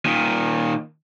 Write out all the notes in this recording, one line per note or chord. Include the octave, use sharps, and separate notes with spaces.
A#2 D#3